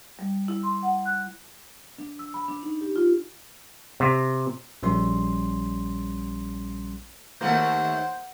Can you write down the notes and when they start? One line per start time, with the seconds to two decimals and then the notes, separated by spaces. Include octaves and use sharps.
0.19 G3
0.48 E4
0.63 C6
0.83 F#5
1.05 F#6
1.99 D4
2.19 E6
2.34 B5
2.48 D4
2.63 D#4
2.81 G4
2.96 F4
4.00 C3
4.83 A#1 G3 C#4 C6
7.41 D#2 A3 A#3 C5 F#5